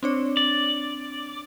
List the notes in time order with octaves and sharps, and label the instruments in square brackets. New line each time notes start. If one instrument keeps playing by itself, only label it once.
[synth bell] C4 D4 C#5
[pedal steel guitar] D5